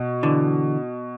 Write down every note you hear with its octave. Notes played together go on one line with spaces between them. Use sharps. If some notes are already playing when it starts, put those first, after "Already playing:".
Already playing: B2
D3 E3